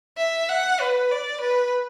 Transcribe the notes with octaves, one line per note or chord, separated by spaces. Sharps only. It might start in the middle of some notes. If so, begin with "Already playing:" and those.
E5
F#5
B4
D5
B4